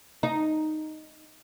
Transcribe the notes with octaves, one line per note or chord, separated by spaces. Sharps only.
D#4